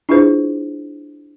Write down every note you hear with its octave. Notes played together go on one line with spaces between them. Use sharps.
D4 E4 F4 G#4 B4 C5